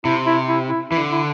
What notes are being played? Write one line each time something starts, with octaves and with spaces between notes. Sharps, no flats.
C3 E4
E4
E4
E4
E3 E4
D3
E4